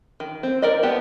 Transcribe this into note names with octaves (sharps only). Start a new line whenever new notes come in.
D#3
C4
A#4 D5 D#5
B3 G4 A5